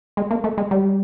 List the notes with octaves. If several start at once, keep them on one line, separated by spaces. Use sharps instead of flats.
G#3
A#3
A3
G#3
G3